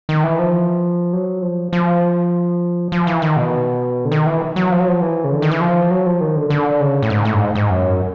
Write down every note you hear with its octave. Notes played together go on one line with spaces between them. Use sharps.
D#3
E3
F3
F#3
F3
F3
F3
E3
D#3
B2
D3
D#3
E3
F#3
F3
F#3
F3
E3
C#3
D3
D#3
E3
F3
F#3
F3
D#3
D3
D3
C#3
A2
G#2
A2
G2
G#2
G#2
F#2